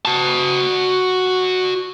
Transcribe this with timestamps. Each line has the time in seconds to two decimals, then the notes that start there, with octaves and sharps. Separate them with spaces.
0.05 F#4 A5